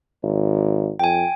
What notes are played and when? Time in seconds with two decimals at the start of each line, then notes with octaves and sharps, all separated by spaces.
0.23 G#1
0.99 F2 G5 G#5